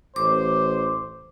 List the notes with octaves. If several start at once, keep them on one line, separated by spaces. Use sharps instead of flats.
A1 C5 D6